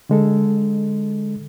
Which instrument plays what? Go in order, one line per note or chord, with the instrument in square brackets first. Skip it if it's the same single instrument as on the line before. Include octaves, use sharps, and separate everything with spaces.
[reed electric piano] D3 G#3 A4